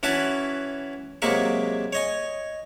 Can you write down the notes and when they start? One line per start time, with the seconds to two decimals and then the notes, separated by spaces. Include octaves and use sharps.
0.03 E3 C#4 F#4 B4 E5 A5
1.22 C3 F#3 G#3 A#3 E5 C#6
1.93 C#5 D#5 G#5